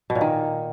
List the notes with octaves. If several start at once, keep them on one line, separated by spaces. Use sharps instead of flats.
B2
A#2
D#3